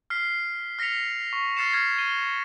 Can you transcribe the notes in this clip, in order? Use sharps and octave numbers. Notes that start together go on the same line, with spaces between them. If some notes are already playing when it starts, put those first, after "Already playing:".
F6 B6 C7
F6 A#6 B6 C#7 F7
C#6
F6 A6 A#6 C7 C#7 E7
F6 G#6 B6
C7 D#7 G7